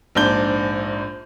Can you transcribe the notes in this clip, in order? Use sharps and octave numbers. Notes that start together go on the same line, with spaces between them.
A#1 G#2 D4 G6 G7